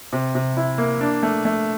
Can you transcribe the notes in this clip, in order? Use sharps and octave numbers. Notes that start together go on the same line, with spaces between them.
C3
C3
E4
A#3
D4
A3
A3